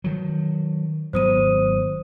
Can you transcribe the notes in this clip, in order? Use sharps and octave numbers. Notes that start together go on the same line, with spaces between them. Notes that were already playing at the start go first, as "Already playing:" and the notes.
D#3 F#3
G#1 F#3 B3 C5 D#6 D#7